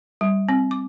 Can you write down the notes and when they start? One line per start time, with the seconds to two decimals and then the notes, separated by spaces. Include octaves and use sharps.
0.21 G3
0.49 C4
0.71 D6